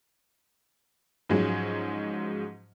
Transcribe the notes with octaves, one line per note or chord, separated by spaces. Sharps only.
G#2 F3 F#3 G#3 C#4